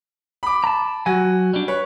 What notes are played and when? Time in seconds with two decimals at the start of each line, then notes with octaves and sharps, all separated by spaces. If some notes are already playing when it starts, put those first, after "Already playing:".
0.43 B5 D6
0.64 A5 A#5
1.06 F#3 F#4 G#5
1.54 G3 D4
1.68 B4 C#5